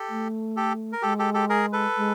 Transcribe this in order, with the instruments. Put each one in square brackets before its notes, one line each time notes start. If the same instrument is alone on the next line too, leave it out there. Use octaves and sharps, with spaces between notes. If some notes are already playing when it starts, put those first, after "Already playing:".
Already playing: [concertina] G4 A4
[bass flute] A3
[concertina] G4 A4
A#4
[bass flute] G#3 [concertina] G4 A4
[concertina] G4 A4
G4 A4
G#4 A#4
A4 B4
[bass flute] G#3